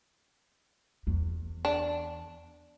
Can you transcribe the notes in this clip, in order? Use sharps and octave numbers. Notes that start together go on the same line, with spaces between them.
E2
D4